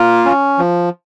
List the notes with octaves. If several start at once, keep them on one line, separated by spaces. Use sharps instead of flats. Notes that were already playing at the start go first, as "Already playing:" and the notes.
Already playing: A#3 F4
C#4
F3